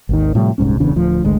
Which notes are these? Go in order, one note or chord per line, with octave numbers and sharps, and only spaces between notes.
G#1 D#2 D#3
A2 C3 F3 G3
D#1 C2 G#2 C#4
D#1 E2 C#3 D4
D1 D2 F3
G#1 D2 G#3